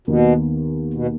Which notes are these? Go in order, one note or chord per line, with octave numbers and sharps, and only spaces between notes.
D#2 B2 D#3 B3
B2